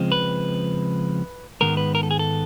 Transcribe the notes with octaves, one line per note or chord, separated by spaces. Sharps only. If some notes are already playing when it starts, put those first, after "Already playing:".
Already playing: C#3 F3 G#3 C4
B4
G#2 D#3 G#3 B3 A#4
B4
A#4
A4
G#4
A4